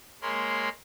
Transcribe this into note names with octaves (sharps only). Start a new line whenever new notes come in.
G#3 A#3 A#4 C#5 B5 C6